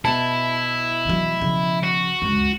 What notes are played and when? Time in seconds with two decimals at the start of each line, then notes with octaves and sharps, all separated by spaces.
0.05 B2 E4 A5
1.05 E3 F#3
1.41 C#3 F3
1.83 F#4
2.22 C#2 F#2